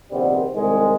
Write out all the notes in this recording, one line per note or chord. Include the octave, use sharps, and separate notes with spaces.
A#1 C3 D#3 G3 B3 C4
C2 D#3 G#3